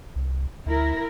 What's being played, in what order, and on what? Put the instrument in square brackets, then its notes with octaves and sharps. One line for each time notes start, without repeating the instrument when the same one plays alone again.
[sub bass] C2
[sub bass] D2 [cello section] E4 A#4